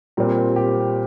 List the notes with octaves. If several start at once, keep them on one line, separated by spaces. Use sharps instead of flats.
A#2 G3 C4 A#4
G4